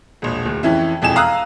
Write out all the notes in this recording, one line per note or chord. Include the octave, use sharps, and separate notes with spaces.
E1 A#1
D1
F2 E3 C#4 E4
E1 F2 E3 G#5 E7
F5 A#5 D#6 E6 F#6